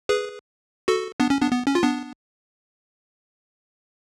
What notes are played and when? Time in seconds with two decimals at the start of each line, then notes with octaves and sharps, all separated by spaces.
0.09 G#4 B4
0.88 F#4 A4
1.20 B3 D4
1.30 C#4
1.41 B3 D4
1.51 B3
1.67 C#4
1.75 F4
1.83 B3 D4